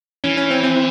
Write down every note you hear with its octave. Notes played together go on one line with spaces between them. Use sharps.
E3 C#4
C#4
C4
C4